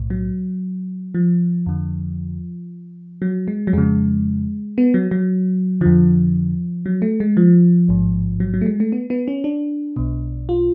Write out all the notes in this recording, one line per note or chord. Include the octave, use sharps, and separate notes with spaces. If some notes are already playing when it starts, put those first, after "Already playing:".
Already playing: B1 A2
F#3
F3
F2 D3
F#3
G#3
F#3
F2 C#3 G#3
B3
F#3
F#3
F2 D3 F3
F#3
A3
G#3
F3
A1 G#2
F#3
F#3
A3
G#3
A3
B3
B3
C#4
D4
B1 B2
F4